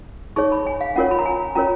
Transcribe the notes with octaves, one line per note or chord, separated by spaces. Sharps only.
D#4 G#4 C#5 C#6
B5
G#5
F5
C#4 F4 A#4 C#5 F#5
B5
A#5
G#5
C#4 F4 A#4 C#5 A#5